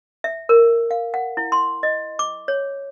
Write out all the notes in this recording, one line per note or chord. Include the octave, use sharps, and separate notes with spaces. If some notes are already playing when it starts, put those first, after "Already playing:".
E5
A#4
F5
F#5
E4
C6
D#5
D6
C#5